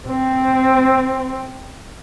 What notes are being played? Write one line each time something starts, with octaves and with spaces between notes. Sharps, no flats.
C4